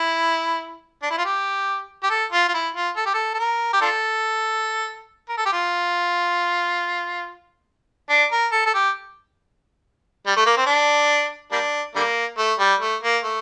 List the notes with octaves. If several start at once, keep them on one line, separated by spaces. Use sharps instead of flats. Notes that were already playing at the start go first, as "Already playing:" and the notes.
Already playing: E4
D4
E4
F4
G4
G4
A4
F4
F4
E4
F4
A4
G4
A4
A4
A#4
G4
D4 F4 A4
A#4
A4
G4
F4
D4
A#4
A4
A4
G4
G3
A3
A#3
C4
D4
G3 A#3 D4
D3 G3 A#3
A3
G3
A3
A#3
A3